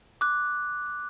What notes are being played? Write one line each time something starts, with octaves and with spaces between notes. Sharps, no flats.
D6 F#6